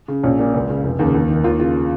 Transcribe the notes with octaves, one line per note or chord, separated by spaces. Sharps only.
C#3
A#1 C#4
A#2
C#2
C#3
F1
D#2 C#3
D#2
D#3
D#2 F4
C#3 F4